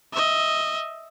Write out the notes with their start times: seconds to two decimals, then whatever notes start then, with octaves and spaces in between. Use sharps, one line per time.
0.12 D#5 E5